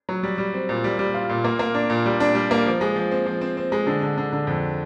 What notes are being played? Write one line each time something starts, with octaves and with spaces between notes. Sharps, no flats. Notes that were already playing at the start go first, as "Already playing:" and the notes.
F#3
G3
G3
C4
A#2
G3
G3
F4
A#2
A#3
A#3
D4
A#2
G3
D4
G3
A#3
F3
G#3
F3
C4
F3
C4
C4
G#3
D3
D3
D3
D3
F2